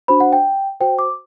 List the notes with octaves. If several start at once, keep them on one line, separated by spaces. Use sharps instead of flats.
D4 F#4 C5 B5
F#5
G5
F#4 C5 G5
D6